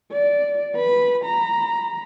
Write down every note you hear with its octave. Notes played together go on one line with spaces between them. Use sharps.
D5
B4 B5
A#5 B5